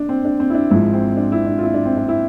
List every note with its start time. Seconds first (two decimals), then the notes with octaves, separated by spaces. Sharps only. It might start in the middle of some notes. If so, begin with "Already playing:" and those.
Already playing: D4
0.09 C4
0.25 D4
0.40 C4
0.50 E4
0.55 D4
0.70 G#1 G#2 F3 E4
0.93 C4
1.17 D4
1.32 E4
1.47 D4
1.58 F4
1.63 E4
1.74 D4
1.85 C4
1.97 D4
2.08 E4